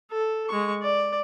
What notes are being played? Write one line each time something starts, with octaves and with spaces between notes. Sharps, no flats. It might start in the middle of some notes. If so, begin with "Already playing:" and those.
A4
G#3 C#6
D5